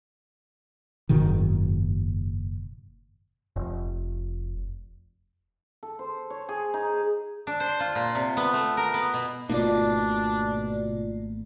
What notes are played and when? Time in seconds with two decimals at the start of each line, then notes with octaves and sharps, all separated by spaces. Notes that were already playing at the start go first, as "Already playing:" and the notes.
1.09 F#1 G#2 B2 D#3
3.56 F1
5.83 A4
5.99 C5
6.30 C#5
6.49 G#4
6.74 D#4
7.47 D4
7.60 C5
7.80 F4
7.95 A#2
8.15 C3
8.37 B3
8.54 A3
8.77 A#4
8.94 B3
9.14 B2
9.50 G#1 B2 A3 A#3 D4 D#4 F4 D5